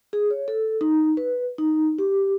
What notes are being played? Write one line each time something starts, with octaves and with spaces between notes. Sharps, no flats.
G#4
C#5
A4
D#4
B4
D#4
G4